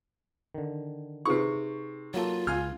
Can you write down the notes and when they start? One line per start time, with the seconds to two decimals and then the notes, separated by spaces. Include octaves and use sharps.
0.54 D3 D#3
1.25 C3 D#4 G#4 B4 C#6
2.14 F#3 A#3 F4 A4
2.47 C#2 F5 G#5 F6 G#6